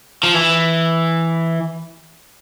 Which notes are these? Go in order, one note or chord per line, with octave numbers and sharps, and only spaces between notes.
F3
E3